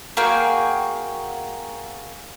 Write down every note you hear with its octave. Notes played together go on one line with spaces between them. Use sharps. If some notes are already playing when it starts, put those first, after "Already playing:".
A#3 F#4 G#4 G5